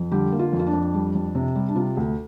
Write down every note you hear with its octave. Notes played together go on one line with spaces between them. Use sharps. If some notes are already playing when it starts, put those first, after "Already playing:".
Already playing: F2
D3 G3 G4
A#3
F4
F2
F4
D4
F2
G3
F2
C3
G3
D4
C3 F4
D2